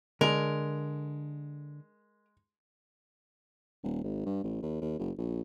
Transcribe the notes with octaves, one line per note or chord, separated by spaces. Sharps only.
D3 G#3 A#4
D#1
G#1
G2
A1
D#2
D#2
F#1
A#1